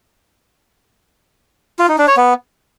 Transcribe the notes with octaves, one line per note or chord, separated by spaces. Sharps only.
F4
D#4
D4
C#5
B3